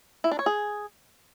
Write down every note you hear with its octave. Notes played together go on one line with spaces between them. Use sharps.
E4
D4
C#5
G#4